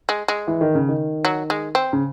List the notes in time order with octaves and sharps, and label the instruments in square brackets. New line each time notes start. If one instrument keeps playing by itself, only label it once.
[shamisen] G#3
G#3
[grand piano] E3
D#3
C#3
D#3
[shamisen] F#3
G#3
C4
[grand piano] C#3